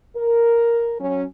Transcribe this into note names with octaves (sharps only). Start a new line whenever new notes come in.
A#4
F#3 C#4